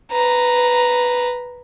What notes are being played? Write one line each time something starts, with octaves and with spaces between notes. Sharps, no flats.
B4 A#5